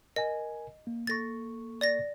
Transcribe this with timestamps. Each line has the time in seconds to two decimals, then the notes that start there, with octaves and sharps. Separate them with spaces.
0.16 A#4 D#5 G#5
0.87 A#3
1.07 A#3 A4 C#6 A6 A#6
1.81 D5 A6 A#6